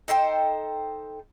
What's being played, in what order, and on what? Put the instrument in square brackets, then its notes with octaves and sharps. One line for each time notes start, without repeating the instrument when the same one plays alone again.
[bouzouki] D#4 A4 C5 G5